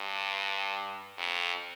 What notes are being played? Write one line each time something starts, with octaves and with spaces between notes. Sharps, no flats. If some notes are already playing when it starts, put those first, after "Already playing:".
Already playing: G2
F2